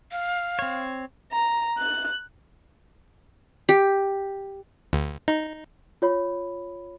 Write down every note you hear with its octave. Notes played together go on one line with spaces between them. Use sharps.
F5
C4 C#5
A#5
F#6
G4
D2
D#4
F4 C#5 B5